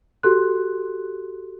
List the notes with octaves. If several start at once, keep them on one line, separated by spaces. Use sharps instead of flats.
F#4 G4 A4 C6 F#6